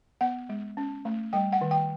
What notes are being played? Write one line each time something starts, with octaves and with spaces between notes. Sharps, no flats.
B3 F#5
G#3
C#4
A3
G3 G5
F#5
D#3
G5